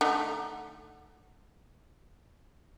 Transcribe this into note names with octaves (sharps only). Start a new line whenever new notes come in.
D3 A3 D#4